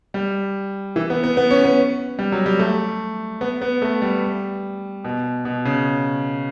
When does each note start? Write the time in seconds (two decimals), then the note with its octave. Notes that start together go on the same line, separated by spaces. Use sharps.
0.14 G3
0.96 E3
1.10 B3
1.23 B3
1.37 B3
1.51 C#4
1.64 B3
2.19 G3
2.32 F#3
2.46 G3
2.59 A3
3.41 B3
3.62 B3
3.82 A3
4.02 G3
5.04 B2
5.45 B2
5.65 C#3